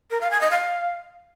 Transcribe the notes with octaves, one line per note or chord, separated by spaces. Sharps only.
A#4
F5
G#5
D#5
F5